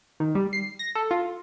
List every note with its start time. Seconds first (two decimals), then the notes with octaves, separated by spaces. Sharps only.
0.20 D#3
0.35 G3
0.53 C7
0.79 A#6
0.95 A4
1.11 F4